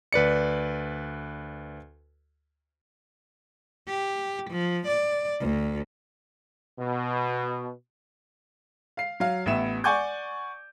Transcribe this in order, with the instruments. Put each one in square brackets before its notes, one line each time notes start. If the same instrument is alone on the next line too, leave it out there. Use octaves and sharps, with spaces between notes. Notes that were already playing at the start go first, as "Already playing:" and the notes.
[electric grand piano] D2 B4 D5 C#7
[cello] G4
F3
D5
D2
[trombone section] B2
[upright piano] F5 C7
F#3 F5
A1 B3 E5 E7
D5 F#5 G#5 C#6 D6 G6